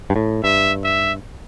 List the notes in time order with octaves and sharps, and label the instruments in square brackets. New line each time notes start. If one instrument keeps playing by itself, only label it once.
[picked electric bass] G2
A2
[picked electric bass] G2 [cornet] E5
[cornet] E5